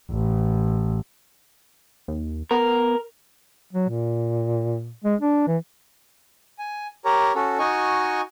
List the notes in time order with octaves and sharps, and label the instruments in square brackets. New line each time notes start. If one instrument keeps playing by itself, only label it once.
[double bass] A1
[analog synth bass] D#2
[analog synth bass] B3 [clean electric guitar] A#4
[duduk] F#3
A#2
G#3
D4
E3
[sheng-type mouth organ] G#5
G4 A#4 C#5 A#5
C#4 F#4 A4
D#4 F#4 D#5 G#5 C#6